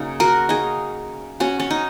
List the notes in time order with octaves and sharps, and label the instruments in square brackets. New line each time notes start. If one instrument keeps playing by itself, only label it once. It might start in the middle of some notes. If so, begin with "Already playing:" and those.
Already playing: [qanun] C#3 F#3 A#3 D#4 G#4
F#4 A#4
D#4 G#4
C#4 F#4
C#4
D#4